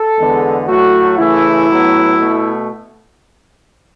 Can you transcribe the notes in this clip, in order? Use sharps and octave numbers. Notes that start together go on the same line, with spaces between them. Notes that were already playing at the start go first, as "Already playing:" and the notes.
Already playing: A4
E2 D3 G#3 B3
A2 F#3 A3 F#4
C#3 E3 A3 E4
A2 F#3 B3
B2 A3